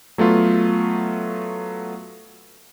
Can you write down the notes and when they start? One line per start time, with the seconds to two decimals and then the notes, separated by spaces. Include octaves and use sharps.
0.18 F#3 A3 B3 F4